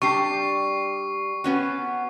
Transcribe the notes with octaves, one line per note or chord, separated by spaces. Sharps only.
G3 D4 G4 C#6 C7
B3 C#4 F#4